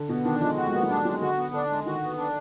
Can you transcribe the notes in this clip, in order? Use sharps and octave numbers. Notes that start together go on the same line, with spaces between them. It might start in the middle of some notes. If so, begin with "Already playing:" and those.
Already playing: D3
B2 B3
D#3 D4
F3 G#3
F#4
G#3
A#3 B3
F#3
G#3 D4
F#3 G#3
D3 F#4
B3
D3 D4
G#3
D#3 F#4
B3
D4